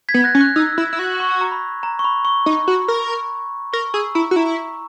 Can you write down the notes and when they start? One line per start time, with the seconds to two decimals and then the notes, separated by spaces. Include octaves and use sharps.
0.09 G#6 B6
0.14 B3
0.19 G#6
0.24 F#6 A#6
0.35 C#4
0.41 F#6
0.56 D#4 E6
0.73 E6
0.78 E4
0.93 E4
0.99 F#4
1.20 C#6
1.41 A#5
1.51 B5
1.83 A#5
1.99 C#6
2.04 B5
2.25 C#6
2.46 D#4
2.68 F#4
2.88 A#4
3.73 A#4 C#6
3.94 G#4 E6
4.15 E4 A#5
4.31 F#4
4.36 E4 A#5